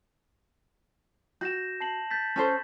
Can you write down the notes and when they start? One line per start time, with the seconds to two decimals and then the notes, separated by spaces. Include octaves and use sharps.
1.41 F#4 G6 A#6 E7
1.80 A5 C7 F#7
2.11 G6 A6 B6
2.36 C#4 A4 C5